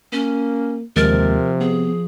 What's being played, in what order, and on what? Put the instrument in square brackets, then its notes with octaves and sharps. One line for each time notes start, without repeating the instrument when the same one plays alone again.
[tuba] A#3 [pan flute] C#4
[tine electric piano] D#2 G#3 A6 [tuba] C3 [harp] F3 [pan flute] A#4
[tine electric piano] B3 [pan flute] G#4